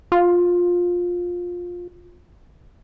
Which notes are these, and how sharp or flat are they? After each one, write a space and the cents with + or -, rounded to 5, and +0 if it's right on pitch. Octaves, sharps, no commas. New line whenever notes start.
F4 +15